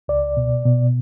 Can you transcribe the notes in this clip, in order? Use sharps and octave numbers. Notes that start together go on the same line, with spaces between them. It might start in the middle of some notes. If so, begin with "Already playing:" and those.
C#2 D5
B2
B2